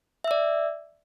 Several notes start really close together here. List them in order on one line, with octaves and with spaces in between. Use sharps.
E5 E6 D5